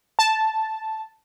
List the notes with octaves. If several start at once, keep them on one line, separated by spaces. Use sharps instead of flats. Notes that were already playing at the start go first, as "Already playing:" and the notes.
A5